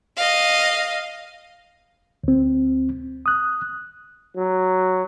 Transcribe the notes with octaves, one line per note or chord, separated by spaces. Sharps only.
D#5 F5
D2 C4
D#6 F#6
F#3